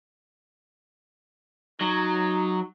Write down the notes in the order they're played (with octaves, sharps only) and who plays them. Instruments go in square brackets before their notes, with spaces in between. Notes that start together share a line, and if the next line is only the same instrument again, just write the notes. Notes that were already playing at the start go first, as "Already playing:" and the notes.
[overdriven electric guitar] F#3 [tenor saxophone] D#4